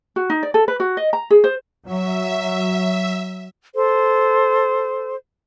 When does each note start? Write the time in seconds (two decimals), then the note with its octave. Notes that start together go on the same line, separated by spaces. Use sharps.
0.16 F#4
0.30 D#4
0.43 D5
0.54 A4
0.68 B4
0.80 F#4
0.97 D#5
1.13 A#5
1.30 G#4
1.44 C5
1.85 F#3 E5
3.75 A4 C5